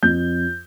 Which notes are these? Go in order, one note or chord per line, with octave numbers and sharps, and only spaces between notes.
F2 G6